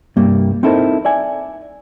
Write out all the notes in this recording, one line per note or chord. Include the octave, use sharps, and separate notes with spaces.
C2 G2 G3 A#3
C4 D#4 E4 A4 A#4 C5
D5 E5 G#5